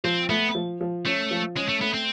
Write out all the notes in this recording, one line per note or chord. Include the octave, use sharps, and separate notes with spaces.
F3 C4
A3 B3
F3
F3
A3 C#4
F3
G#3 C#4
A3
A3 B3
C4